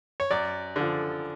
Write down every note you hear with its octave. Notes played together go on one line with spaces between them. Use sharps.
C#5
F#2 D5
D3 F3